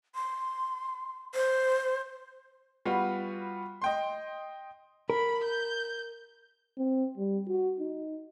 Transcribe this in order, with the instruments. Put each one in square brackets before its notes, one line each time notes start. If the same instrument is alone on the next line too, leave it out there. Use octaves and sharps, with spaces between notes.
[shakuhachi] C6
C5
[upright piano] G3 B3 F4 F#4
D#5 G5 C6
[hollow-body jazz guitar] A#4 [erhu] B5
[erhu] G6
[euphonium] C4
G3
F#4
D#4